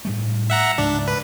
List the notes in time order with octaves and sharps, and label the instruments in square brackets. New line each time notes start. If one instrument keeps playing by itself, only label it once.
[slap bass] A2 G3 A3
[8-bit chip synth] E5 F#5 A#5
[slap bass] C#2 G#2 [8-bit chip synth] D4
[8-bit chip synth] B4